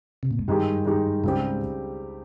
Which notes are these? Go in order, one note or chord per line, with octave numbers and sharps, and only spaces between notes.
C3
A#2
G#2
G2 D#3 G#3 D#4 G4
D#3 G#3 D#4 G4
C#2 G#2 C#3 G3 C4 G4